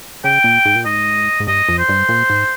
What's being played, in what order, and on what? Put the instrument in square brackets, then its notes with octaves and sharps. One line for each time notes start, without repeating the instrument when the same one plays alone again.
[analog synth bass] C#3 [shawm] G5
[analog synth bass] A#2
G#2
A#2
[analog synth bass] G#2 [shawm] D#5
[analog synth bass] G#2
[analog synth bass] G2 [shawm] D#5
[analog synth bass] F2
[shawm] C5
[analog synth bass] G2
A#2
G#2